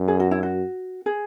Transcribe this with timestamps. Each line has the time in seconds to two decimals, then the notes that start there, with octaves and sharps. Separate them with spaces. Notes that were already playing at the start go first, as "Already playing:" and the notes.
Already playing: F#2
0.08 G#4
0.20 F#4
0.31 E4
0.43 F#4
1.06 G#4